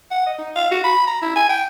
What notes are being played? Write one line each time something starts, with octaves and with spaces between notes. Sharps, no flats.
F#5
D#5
D#4
F5
F#4
B5
A#5
E4
G#5
G5